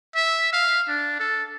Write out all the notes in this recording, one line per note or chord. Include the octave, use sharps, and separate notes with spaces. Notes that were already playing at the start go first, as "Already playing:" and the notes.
E5
F5
D4
A4